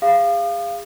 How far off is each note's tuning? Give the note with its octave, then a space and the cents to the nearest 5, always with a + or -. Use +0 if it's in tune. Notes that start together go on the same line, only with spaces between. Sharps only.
G#4 -35 F5 -20 D#6 -40